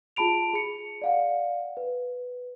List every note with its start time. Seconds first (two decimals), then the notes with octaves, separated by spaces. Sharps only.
0.16 F4 G#4 A5 B5 D7 F7
0.54 G#4 C#7
1.02 D5 F5 F#5
1.77 B4